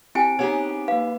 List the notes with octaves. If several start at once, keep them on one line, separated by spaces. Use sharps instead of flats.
C4 E4 G4 G5 G#5 D7
B3 D#4 G4 G#4 C#5
A#3 B4 F5